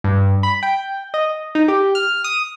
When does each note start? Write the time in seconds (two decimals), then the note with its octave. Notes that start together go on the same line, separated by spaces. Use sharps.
0.04 G2
0.43 B5
0.63 G5
1.14 D#5
1.55 D#4
1.68 G4
1.95 F6
2.24 D#6